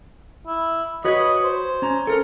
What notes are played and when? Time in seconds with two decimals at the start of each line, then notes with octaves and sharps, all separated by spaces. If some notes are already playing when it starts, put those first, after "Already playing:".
0.47 E4
1.05 F#4 B4 C#5 D#5
1.44 C5
1.82 C#4 A#5
2.07 A4 A#4